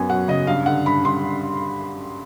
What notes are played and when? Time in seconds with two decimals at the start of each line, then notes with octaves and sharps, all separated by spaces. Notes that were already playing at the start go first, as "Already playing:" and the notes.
Already playing: F#2 B3 G#5
0.09 F#3 F#5
0.28 C#3 D#5
0.47 G2 F5
0.66 D3 F#5
0.86 G2 B5
1.05 G2 C6